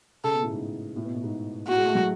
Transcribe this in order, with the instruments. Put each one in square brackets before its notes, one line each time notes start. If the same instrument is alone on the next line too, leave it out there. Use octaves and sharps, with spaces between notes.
[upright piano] C#3 [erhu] A4
[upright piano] B2
A2
G#2
A2
B2
A2
G#2
[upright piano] A2 [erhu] F#4
[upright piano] G#3
A3
F#3